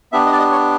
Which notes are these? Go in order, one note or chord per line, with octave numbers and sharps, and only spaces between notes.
B3 D4 G4 E5
D#5
D5
D#5
C#5